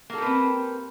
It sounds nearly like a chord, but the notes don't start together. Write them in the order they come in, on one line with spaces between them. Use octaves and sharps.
A#3 A4 G4 B4 C4